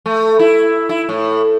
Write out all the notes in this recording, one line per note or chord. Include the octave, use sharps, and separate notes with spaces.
A3
E4
E4
A2